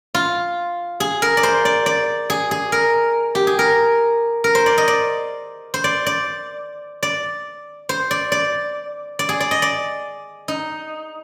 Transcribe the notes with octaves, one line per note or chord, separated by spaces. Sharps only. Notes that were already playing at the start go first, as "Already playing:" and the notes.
F4
G#4
A#4
D5
C5
D5
D5
G#4
G#4
A#4
G4
G#4
A#4
A#4
C5
D5
D#5
D5
C5
D5
D5
D5
C5
D5
D5
D5
G#4
D5
D#5
D5
D#4